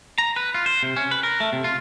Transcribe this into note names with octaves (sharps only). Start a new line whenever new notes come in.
A#5
B4
F4
C5
C3
C#4
B4
A#4
A3
C3
F4